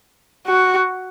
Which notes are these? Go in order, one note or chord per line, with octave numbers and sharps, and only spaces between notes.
F#4